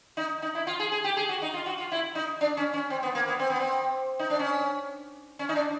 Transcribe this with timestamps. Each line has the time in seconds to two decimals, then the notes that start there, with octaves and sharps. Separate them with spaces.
0.17 D#4
0.42 D#4
0.55 E4
0.67 F4
0.80 G#4
0.92 G#4
1.04 G4
1.17 G#4
1.29 F#4
1.42 D#4
1.54 F4
1.66 F#4
1.78 F4
1.92 E4
2.15 D#4
2.41 D4
2.57 C#4
2.73 C#4
2.90 C4
3.03 B3
3.15 A#3
3.28 B3
3.39 C4
3.50 B3
3.60 C4
4.19 D#4
4.30 D4
4.39 C#4
5.39 C#4
5.49 D#4
5.55 D4